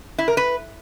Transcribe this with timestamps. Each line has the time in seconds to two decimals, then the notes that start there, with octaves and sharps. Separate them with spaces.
0.18 E4
0.28 A#4
0.37 B4